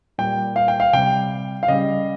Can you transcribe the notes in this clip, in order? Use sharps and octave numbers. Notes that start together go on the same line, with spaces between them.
A#2 G3 G5
F5
G5
F5
C3 G3 G5
F5
C#3 G3 D#5